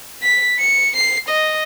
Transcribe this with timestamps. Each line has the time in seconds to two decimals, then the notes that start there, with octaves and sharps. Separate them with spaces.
0.22 B6
0.59 C#7
0.96 C7
1.29 D#5